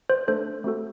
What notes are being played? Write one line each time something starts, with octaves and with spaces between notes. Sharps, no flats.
C5
A3 D4 A4 C5
A3 C4 F#4 A4